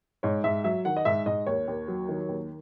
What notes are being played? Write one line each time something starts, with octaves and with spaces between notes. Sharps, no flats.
G#2 C#5
G#2 E5
F#3 E5
D#3 F#5
D#5
G#2 E5
G#2 D#5
D#2 C#5
D#2
F#3
D#3
D#2